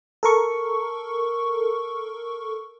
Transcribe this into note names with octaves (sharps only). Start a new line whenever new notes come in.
A4 A#4 C#6